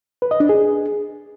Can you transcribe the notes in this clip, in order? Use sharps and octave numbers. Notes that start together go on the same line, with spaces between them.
B4
D#5
D4
G#4